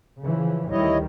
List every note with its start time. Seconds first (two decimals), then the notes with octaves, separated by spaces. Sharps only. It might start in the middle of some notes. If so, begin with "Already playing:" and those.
0.21 C#3 E3 F3
0.71 D2 D#3 G3 E4 C#5 D#5